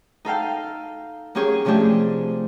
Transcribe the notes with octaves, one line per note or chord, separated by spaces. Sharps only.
D#4 A4 F5 G5
A#3 C#4 G4 G#4 C#5
C3 F3 A3 D4 G4 G#4